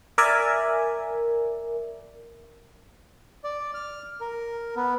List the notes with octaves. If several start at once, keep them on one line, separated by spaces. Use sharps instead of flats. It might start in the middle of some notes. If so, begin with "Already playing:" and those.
A#4 D5 E5 G#5
D5
F6
A#4
B3